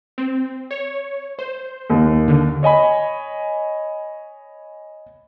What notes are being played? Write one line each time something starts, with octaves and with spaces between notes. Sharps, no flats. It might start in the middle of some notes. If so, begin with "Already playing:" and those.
C4
C#5
C5
D#2
D3
C#5 D#5 G#5 B5